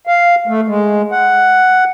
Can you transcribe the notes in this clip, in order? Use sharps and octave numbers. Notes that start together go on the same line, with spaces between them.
F5
A3
G#3
F#5